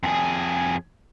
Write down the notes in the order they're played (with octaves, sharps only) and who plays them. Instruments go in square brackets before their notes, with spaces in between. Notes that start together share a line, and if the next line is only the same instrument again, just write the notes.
[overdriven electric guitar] F2 G#4